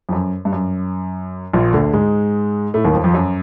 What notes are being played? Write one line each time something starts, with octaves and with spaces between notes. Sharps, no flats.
F2
F#2
G2
F#2
A#1 A#2
D2 D3
G#2 G#3
A2 A3
D#2 D#3
F2 F3
F2 F3
F#2 F#3